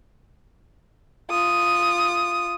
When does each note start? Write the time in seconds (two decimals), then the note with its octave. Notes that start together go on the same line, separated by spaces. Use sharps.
1.30 F4 D#6